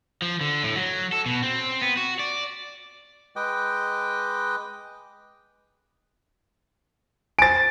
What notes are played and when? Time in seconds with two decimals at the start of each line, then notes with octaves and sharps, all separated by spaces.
0.22 F3
0.41 D3
0.64 A2
0.76 F#3
1.13 A4
1.26 B2
1.42 C4
1.82 B3
1.97 F#4
2.19 D5
3.36 G#3 B4 D#5 G5 D6
7.39 C5 G#5 A6 D7